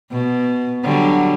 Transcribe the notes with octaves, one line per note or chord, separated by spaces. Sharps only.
B2
D3 F#3 G3